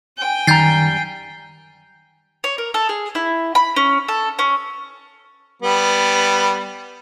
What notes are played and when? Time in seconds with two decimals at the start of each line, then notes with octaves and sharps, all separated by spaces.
0.18 G5 G#5
0.47 F#2 D#3 G3 A#5 G6 A6 C7
2.44 C#5
2.58 A#4
2.74 A4
2.89 G#4
3.15 E4
3.55 B5
3.76 C#4
4.08 A4
4.39 C#4
5.62 G3 B3